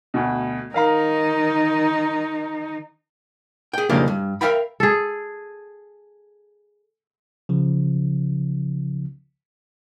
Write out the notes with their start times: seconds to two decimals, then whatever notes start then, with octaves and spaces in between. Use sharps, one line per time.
0.14 D2 B2
0.74 D#3 D#4 A#4 F5 A#5
3.73 G#4 G5
3.90 F2 A2 C#3 A#3 D4 G4
4.08 G2
4.41 A#4 C5 E5 F5 G5 B5
4.80 G#4 A4
7.49 C#3 F3